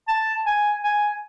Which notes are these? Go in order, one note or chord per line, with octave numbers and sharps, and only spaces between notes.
A5
G#5
G#5